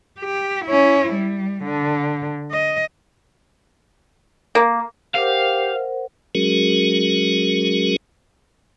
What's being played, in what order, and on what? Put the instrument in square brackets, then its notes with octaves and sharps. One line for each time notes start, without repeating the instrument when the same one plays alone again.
[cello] G4
C#4 E4
G3
D3
D#5
[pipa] A#3
[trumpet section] G4 [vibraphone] A#4 C5 F#5 [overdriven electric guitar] F5
[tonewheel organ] F#3 G#3 C#4 F#4 G#4 A#4